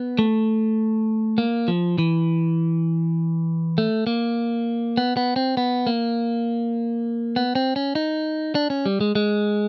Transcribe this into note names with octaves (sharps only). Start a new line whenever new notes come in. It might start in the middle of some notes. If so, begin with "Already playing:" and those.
Already playing: B3
A3
A#3
F3
E3
A3
A#3
B3
B3
C4
B3
A#3
B3
C4
C#4
D#4
D4
C#4
G3
G#3
G#3